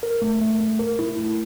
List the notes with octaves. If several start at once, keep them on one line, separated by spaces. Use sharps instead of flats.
A#4
A3
A3
A3
A#4
E4
A3